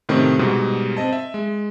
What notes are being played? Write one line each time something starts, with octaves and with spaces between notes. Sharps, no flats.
A2 C3 D#3 A3 C4 C#4
G#2 B2 G3
C4 D#5 A5
E5
G#3